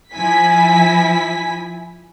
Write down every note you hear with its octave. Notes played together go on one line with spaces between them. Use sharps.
F3 E4 G#5 B6